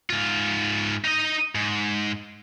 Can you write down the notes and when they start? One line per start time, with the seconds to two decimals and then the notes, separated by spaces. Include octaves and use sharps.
0.10 G#2 F4
1.04 D#4 D#5
1.55 G#2